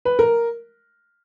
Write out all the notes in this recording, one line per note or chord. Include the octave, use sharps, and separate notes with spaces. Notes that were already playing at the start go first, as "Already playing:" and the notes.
B4
A#4